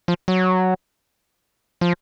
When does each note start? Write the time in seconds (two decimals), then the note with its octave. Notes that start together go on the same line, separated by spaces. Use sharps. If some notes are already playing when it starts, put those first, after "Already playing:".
0.08 F3
0.28 F#3
1.81 F3